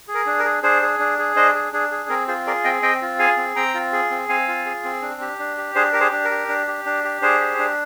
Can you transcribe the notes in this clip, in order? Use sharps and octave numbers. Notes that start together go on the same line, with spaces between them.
G#4
A#4
D4
A#4
G#4
D4 G#4 C5
G#4
D4
G#4
D4 C5 D#5
G#4
D4 G#4
G#4
C4 A#4
F4 G#4 C5
G#4 A#4 D5
C4 D#5 G5
C4 D#5 G5
F4
G#4 F5 G#5
C4
C4 G5 A#5
F4
G#4
C4
C4 F5 G#5
F4
G#4
C4
D4
G4
D4
G4
D4 G#4 C5
G4 A#4
G#4 C5
D4
A#4
G4
D4
G4
D4
G4
D4 G#4 C5
G4
D4